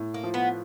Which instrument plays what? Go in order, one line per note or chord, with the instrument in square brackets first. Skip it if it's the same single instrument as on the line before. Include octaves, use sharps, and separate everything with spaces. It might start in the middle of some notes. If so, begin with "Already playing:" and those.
Already playing: [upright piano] A2
[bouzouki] A#3
[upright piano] F3
[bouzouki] B3